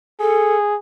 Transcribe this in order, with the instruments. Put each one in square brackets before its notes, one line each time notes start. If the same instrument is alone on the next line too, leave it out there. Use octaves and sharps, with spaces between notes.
[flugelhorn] G#4 [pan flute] A4